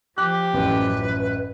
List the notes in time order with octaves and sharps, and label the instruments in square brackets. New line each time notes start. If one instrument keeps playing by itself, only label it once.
[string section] F3 [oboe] G4 [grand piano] F#6
[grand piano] A1 F#2 [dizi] B4